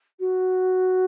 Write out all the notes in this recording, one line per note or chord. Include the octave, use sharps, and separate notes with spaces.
F#4